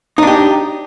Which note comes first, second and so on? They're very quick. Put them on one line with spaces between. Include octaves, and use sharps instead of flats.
D#4 D4 G4